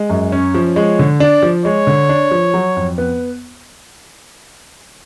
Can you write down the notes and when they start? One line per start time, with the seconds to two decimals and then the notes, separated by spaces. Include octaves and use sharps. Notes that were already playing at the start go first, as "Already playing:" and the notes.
Already playing: G#3
0.10 F#2
0.32 C#4 C#5
0.54 F3
0.76 G#3 C#5
0.99 D3
1.20 D4 D5
1.43 F3
1.65 G#3 C#5
1.87 D3
2.09 D4
2.31 F3
2.54 F#3
2.76 F2
2.98 B3